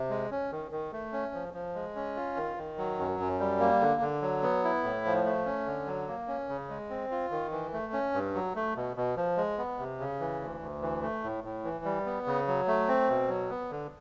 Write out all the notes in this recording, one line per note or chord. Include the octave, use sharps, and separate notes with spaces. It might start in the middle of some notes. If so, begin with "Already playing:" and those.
Already playing: C3
G#3
C#4
D#3
D#3
A3
C#4
F3
F3
G#3
C#4
F4
D#3
D#3
F#3
F#2
F#2
G3
A#3
D3
D3
F#3
B3
E4
A2
F3
A3
C#4
D3
F#3
A#3
C#4
C#3
G#3
C4
F4
D#3
E3
A3
C#4
G2
F#3
A3
B2
B2
F3
G#3
B3
C3
C#3
E3
D2
D2
E3
A3
A2
A2
E3
G3
B3
C#3
F#3
A3
C4
B2
F#3
B3
D3